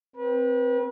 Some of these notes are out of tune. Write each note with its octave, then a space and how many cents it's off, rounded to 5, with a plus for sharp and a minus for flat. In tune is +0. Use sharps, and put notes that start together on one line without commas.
C4 +0 B4 -35